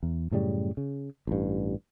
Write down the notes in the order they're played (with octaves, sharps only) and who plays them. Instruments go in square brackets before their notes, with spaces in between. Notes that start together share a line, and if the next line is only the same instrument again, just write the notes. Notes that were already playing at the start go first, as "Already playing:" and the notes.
[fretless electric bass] E2
F#2 A2 C#3 G3
C#3
A1 G2